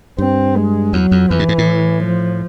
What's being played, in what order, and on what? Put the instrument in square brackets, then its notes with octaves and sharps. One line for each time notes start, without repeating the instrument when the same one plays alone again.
[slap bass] G2 [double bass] C4
[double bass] G#3
[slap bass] E2 [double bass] F#3
[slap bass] F2
[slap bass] F2 [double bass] E3
[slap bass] G2
G#2
A2
[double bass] F3